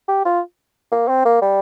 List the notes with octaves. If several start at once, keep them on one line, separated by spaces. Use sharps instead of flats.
G4
F4
A#3
C4
A#3
G3